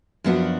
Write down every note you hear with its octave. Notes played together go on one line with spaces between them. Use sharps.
F#2 F3 B3 D4 F#4